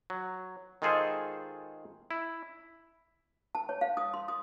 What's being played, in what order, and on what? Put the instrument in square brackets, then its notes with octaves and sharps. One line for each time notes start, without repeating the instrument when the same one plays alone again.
[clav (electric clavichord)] F#3
D#3 G#3 F4 G#4 A4 C5
E4
[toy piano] A5
C#5
F5
D#6
C6
D#6